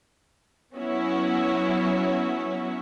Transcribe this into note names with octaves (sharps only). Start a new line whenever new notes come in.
F#3 B3 C#4 E4 F#4 C#5